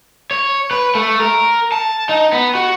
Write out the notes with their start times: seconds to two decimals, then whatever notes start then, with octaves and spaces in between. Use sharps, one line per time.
0.31 C#5
0.71 B4
0.95 A3
1.20 A#4
1.72 A5
2.09 D#4
2.32 B3
2.55 F#4